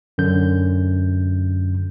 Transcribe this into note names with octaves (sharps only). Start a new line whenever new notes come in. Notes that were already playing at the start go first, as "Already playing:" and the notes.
F#2 D3 G6